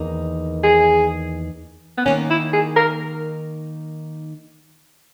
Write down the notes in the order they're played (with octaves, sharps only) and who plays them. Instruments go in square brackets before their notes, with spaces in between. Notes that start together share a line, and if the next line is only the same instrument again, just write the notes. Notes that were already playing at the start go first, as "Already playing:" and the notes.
Already playing: [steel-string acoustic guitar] E2 D#3 A#3 D#4
[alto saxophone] G#4
B3
[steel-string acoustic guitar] D#3 A#3 D#4 [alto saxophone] C#4
[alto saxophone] E4
G#4
A#4